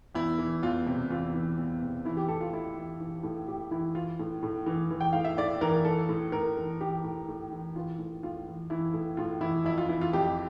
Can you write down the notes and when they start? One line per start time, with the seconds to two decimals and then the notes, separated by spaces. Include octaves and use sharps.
0.15 E2 E4
0.38 E3
0.63 E2 F4
0.87 C3
1.10 E2 F4
1.34 E3
1.58 E2
1.82 C3
2.05 E3 E4
2.17 G4
2.28 A2 A4
2.41 F4
2.53 A2 E4
2.77 E3
3.00 E3
3.23 A2
3.48 A2 G4
3.71 E3 E4
3.95 E3 F4
4.19 A2
4.43 A2
4.66 E3
4.90 E3
5.01 G5
5.13 A2 F5
5.24 E5
5.37 A2 D5
5.61 E3 A#4
5.85 E3 A4
6.09 A2
6.32 A2 A#4
6.57 E3
6.80 E3 G4
7.04 A2
7.28 A2
7.51 E3
7.76 E3 F4
7.98 A2
8.23 A2 F4
8.47 E3
8.70 E3 E4
8.93 A2
9.17 A2 F4
9.41 E3 E4
9.65 F2 E4
9.78 F4
9.89 E3 E4
10.01 F4
10.13 F2 G4